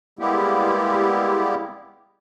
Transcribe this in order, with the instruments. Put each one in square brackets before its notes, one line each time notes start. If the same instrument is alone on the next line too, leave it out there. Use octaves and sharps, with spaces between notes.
[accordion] G3 G#3 A#3 B3 E4 G4